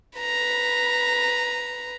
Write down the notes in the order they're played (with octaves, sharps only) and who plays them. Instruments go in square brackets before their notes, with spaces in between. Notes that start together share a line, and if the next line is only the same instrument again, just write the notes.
[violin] B4 A#5